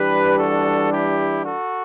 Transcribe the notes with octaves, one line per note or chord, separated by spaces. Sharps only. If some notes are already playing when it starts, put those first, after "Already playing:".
Already playing: E3 G3 D4 G4 B4
F#4 A4
E4 G4
F#4 A4